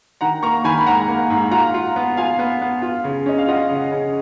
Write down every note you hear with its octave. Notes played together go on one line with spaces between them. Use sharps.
D#3 F#5 A#5
A#3 A#5 C#6
D#3 G#5 B5
B5
G#2 F#5 A#5
A#3
G#2
F4 F#5 A#5
F4
B3
F4 F5 G#5
B3
B3
F4
C#3
C#4 D#5
F5
F4 D#5 F#5
C#3
C#3